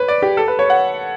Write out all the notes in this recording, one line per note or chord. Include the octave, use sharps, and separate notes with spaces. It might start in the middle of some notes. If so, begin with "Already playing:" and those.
Already playing: B4 C#5
D5
G4
A4
B4
C#5
F#5